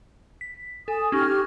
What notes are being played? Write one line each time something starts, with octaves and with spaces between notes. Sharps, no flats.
B6
A4 G#5 D#6
C#4 D#4 G4 C#6 F6